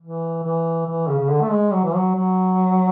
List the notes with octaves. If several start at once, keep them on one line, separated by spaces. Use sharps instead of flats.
E3
E3
E3
C#3
C#3
D3
A3
G#3
F#3
E3
F#3
F#3